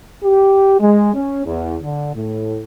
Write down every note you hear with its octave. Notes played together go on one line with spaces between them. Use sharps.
G4
G#3
C#4
E2
D3
A2